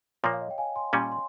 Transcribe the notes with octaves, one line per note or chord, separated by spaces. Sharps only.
A#2 F3 A#3 C#5
F5
D#5
G5
F5 G#5
G#5 C6
A#2 G3 C#4 G#5 C6
C6